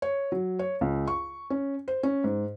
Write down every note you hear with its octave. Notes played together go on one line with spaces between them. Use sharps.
C#5
F#3
C#5
C#2
C#6
C#4
C5
C#4
G#2